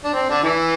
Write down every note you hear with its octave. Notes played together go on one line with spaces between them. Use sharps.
D4
C4
D3 D4
E3 E4